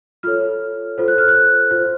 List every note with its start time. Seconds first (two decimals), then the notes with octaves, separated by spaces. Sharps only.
0.23 F4 A4 C#5 F6
0.98 F4 A4 C5
1.08 F#6
1.18 F6
1.28 F#6
1.71 F4 C5